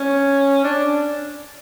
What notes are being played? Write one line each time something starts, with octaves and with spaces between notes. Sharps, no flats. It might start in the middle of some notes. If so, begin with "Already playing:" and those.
Already playing: C#4
D4